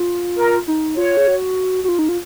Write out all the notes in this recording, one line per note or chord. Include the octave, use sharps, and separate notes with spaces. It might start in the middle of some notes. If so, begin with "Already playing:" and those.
Already playing: F4
A#4
D#4
F4 C#5
G#4
F#4
F#4
F4
D#4
F4